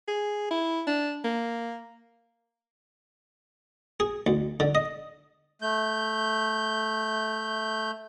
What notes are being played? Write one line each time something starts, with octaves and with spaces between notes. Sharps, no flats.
G#4
E4
D4
A#3
G#4
D2
D3
D#5
A3 G6